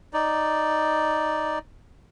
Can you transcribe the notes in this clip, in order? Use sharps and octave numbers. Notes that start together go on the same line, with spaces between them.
D#4 D5